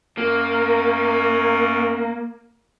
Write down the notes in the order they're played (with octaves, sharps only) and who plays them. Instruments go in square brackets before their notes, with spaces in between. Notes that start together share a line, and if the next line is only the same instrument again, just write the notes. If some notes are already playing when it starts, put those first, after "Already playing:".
[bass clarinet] F#2 [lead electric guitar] A#3